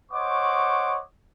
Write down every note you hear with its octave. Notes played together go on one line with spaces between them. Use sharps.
C5 C#5 D#5 F#5 C#6 D6